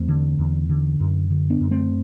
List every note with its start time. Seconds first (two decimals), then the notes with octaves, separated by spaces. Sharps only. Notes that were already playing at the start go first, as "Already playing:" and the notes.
Already playing: E2 A3 C4
0.08 D3
0.39 E2
0.69 D3
1.00 F#2
1.30 D3
1.50 B3 D4
1.61 F#2
1.71 A3 C4